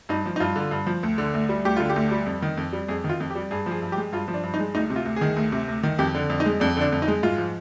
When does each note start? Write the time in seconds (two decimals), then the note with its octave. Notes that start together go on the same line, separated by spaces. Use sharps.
0.09 G2 D#4
0.26 F3
0.36 D#4
0.40 G2 F4
0.56 D3
0.71 G2
0.87 F3
1.03 D2
1.18 D3
1.34 D2
1.49 G3
1.65 D2 G4
1.77 D3 F4
1.90 G4
1.96 D2
2.11 G3
2.26 F2
2.42 D#3
2.57 F2
2.73 G3
2.88 F2 G#4
3.04 D#3
3.09 F4
3.20 F2
3.30 G4
3.35 G3
3.51 G2 G#4
3.66 F3
3.71 G#4
3.82 G2
3.92 G4
3.97 G#3
4.12 G2 F4
4.28 F3
4.34 D4
4.43 G2
4.54 D#4
4.60 G#3
4.75 D2 D#4
4.90 C3
4.96 F4
5.05 D2
5.16 G#4
5.21 D#3
5.36 D2
5.52 C3
5.68 D2
5.83 D#3
5.99 F2 G4
6.15 D3
6.30 F2
6.40 D#4
6.46 G#3
6.60 F2 D4
6.77 D3 D4
6.92 F2
7.02 D#4
7.08 G#3
7.23 G#2 F4
7.38 F3